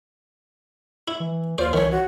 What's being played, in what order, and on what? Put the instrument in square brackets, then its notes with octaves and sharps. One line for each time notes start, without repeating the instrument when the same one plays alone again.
[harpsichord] E4
[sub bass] E3
[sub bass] D#2 [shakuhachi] F4 [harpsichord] C5 D5
[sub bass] C2 [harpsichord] D#3 E3 [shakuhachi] C#5
[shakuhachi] F#4